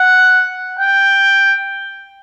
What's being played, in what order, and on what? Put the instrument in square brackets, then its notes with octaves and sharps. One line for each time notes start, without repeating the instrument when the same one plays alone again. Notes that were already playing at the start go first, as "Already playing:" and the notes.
Already playing: [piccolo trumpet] F#5
G5